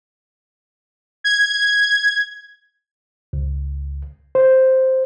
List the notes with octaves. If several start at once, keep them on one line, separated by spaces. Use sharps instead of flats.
G#6
C#2
C5